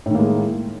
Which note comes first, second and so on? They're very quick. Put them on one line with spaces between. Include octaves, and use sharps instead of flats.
A2 D#3 A#3 G#3